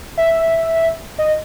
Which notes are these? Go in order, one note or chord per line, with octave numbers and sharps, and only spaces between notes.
E5
D#5